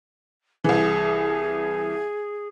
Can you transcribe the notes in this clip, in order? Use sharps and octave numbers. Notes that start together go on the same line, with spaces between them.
C2 E3 G#4